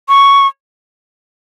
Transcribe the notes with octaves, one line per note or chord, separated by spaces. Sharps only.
C#6